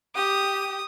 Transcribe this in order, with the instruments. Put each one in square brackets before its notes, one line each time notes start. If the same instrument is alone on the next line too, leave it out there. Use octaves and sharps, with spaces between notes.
[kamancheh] G4 [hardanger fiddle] D#6